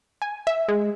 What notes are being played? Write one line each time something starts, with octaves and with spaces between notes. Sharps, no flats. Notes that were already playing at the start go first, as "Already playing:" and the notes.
G#5
E5
G#3